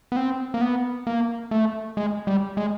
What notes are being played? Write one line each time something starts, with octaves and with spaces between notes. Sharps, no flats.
B3
C4
A#3
B3
A#3
A3
G#3
G3
G#3